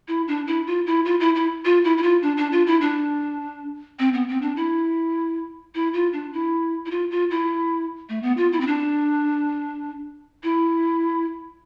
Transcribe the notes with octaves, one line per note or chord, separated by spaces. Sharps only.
E4
D4
E4
F4
E4
F4
E4
E4
F4
E4
E4
F4
D4
D4
F4
E4
D4
C4
B3
C4
D4
E4
E4
F4
D4
E4
E4
F4
F4
E4
A3
B3
F4
E4
C4
D4
E4